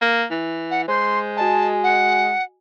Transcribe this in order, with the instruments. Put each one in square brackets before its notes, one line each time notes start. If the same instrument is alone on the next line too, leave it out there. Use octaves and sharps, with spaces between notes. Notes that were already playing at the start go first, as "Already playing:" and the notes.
[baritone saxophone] A#3
E3
[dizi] F#5
[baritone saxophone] G#3 [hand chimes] C5 G6 [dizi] C6
[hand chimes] F#4 D#5 G#5 [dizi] A5
[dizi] F#5